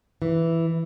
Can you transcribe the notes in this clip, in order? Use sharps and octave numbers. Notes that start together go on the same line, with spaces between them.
E3